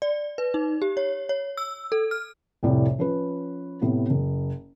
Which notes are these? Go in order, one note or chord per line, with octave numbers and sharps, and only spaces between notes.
D5
B4
D#4
G4
C#5
C#5
E6
A4
F6
F1 C2 A2 D5
F3 C#4 B4
A2 C3 B3
F#1